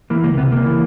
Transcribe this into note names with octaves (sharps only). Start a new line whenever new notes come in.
E3 A#3
C#2 A#3
C3 B3
C#2 A#3
E3